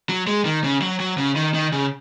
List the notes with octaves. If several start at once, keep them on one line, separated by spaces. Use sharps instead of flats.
F#3
G#3
D#3
C#3
F#3
F#3
C#3
D#3
D#3
C#3